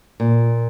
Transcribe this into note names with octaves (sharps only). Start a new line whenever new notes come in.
A#2